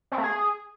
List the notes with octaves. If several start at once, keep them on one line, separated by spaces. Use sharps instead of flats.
C4
A3
G#4